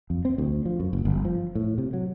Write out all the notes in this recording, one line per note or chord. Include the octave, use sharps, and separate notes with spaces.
F2
C4
D2
F3
F#2
F#1
G1
F3
A2
C3
F#3